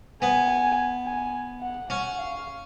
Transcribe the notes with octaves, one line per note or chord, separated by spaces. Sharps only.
B3 G#5
G#5
G#5
F#5
C#4 F#5
F5